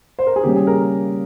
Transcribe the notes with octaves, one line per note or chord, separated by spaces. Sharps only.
C5
A#4
G#4
C#3 G3 A#3 C#4 G4
G#4
A#4